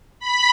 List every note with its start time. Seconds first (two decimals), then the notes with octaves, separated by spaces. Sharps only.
0.20 B5